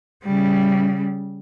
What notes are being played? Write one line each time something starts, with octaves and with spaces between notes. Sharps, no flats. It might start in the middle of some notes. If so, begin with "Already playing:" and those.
C#3 G3